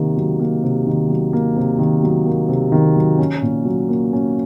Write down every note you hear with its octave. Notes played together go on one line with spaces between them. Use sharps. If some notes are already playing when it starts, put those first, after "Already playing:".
Already playing: C3 D#3 A#3
F#3
A#3
C3
D#3
F#3
A#3
C3
D#3
F#3
A#3
C3
D#3
F#3
C#4
A#2
F#3
A#3
C#4